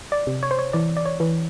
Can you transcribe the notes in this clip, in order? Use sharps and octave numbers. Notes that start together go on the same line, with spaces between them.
D5
C3
C#5
C5
C#5
E3 D5
D5
C#5
E3